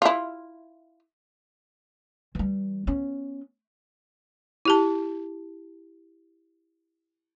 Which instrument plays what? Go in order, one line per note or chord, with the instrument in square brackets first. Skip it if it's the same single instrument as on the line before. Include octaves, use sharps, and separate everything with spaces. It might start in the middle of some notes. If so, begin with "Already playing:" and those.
[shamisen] E4 F4
[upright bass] E3 G3
B3 C#4
[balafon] E4 G4 A5